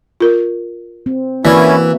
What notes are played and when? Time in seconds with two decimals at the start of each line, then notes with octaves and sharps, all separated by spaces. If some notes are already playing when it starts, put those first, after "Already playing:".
0.20 F4 A#4
1.06 C4
1.45 E3 A#3 C#4 E4 F#4 B4 D5